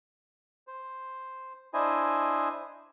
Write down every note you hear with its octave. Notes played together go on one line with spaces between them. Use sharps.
C5
D4 E4 C5 D#5 G#5